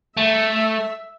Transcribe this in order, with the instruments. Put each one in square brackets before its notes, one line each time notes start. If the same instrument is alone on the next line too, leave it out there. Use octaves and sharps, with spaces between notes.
[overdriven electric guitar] A3 [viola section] E5